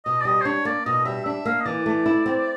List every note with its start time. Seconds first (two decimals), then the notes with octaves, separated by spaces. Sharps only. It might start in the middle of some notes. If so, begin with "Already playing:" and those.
0.05 B2 D#5
0.21 D5
0.25 G3 D#5
0.41 C5
0.45 D4 C#5
0.65 A#3 D5
0.86 B2 D#5
1.05 G3 E5
1.25 D4 E5
1.45 A#3 F5
1.60 D#5
1.66 E3 D5
1.86 A3
2.06 E4
2.26 C4